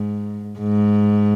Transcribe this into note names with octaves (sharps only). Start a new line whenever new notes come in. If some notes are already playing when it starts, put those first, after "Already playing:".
Already playing: G#2
G#2